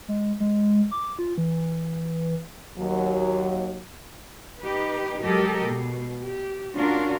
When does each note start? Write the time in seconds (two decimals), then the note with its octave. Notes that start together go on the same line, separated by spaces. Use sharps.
0.08 G#3
0.40 G#3
0.91 D6
1.19 F4
1.38 E3
2.78 D#2 F#3
4.61 D#4 G4 B4
5.22 F#3 G#3 G4 A4 A#4 D#5
5.68 B2
6.25 G4
6.74 C#4 D4 F4 F#4 A#4